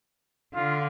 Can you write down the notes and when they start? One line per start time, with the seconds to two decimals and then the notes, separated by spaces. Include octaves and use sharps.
0.55 D3 F4